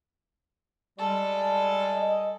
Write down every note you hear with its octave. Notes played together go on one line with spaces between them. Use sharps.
G3 G#3 A4
D#5